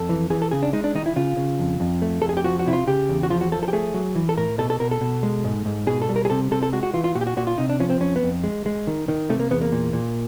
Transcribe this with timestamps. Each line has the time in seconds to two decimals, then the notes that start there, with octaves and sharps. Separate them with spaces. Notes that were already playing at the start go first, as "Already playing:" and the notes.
Already playing: F2 A4
0.09 E3
0.30 E3 G#4
0.42 A4
0.51 C#3 G#4
0.63 D4
0.73 G#3 D#4
0.84 D4
0.95 D#3 D#4
1.06 E4
1.16 C#3 F4
1.37 C#3
1.59 F2
1.80 F2
2.02 A3
2.22 F2 A4
2.29 G#4
2.37 G4
2.44 F3 F#4
2.60 F#4
2.66 C3 E4
2.73 F4
2.87 C#3 G4
3.09 E2
3.23 F#4
3.30 F3 F4
3.41 F#4
3.52 F3 A4
3.63 A4
3.68 G4
3.73 A3 G#4
3.94 F#3
4.15 E3
4.29 A4
4.37 A2 A#4
4.58 B2 A4
4.70 A4
4.80 B2 A#4
4.91 A4
5.01 B2
5.23 G#3
5.44 G#2
5.66 G#2
5.87 B2 G#4
6.02 A4
6.09 G3
6.16 A#4
6.25 G#4
6.30 C3 A4
6.51 C3 A4
6.63 A4
6.73 G#3 F#4
6.83 F#4
6.93 E3 F4
7.04 F4
7.15 A#2 F#4
7.21 G4
7.27 F#4
7.37 A#2 F#4
7.47 F4
7.58 C3 D#4
7.69 D4
7.80 F3 C#4
7.90 C4
8.01 F2 C#4
8.16 B3
8.23 F2
8.44 G#3
8.66 G#3
8.87 D#3
9.08 D#3
9.29 C3 A3
9.40 A#3
9.50 E2 B3
9.61 A#3
9.72 A#2
9.93 A#2